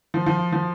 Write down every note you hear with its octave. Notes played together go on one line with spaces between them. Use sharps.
F3
F3
F3